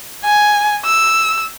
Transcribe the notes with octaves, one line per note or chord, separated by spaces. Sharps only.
G#5
E6